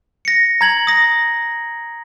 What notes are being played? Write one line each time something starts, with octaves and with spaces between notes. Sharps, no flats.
A#6 C#7
A#5 G#6 F#7
D#6 A#6